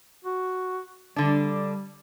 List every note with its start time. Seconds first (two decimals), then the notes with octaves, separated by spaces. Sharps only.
0.25 F#4
1.16 D3 G3 D4